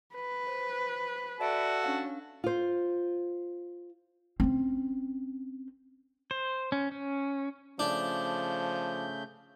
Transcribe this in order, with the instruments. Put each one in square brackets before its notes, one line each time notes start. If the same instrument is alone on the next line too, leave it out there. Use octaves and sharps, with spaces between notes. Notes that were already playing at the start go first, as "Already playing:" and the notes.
[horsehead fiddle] B4
[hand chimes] C5
[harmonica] F#4 A4 A5 [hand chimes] D5 E5 D7
[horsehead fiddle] C#4 [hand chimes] D4 F5
[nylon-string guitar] F4 C5
[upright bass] C4 C#4
[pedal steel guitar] C5
C#4
C#4
[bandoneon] C#3 A3 G6 [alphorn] F3 [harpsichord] D4